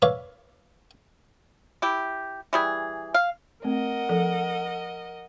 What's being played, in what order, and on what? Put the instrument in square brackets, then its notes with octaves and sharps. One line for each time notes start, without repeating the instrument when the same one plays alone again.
[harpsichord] B4 C#5 D5 E5 F5
[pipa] E4 G4
E3 G3 G#4
F5
[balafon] A3 C4 [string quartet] A#4 D#5 F#5
[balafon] F3 A4 D5